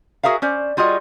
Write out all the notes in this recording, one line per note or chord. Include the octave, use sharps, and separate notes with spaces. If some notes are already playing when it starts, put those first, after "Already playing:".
F#4 G#4 A#4 E5 F5
C#4 C5 D5
G3 F4 F#4 G#4 D#5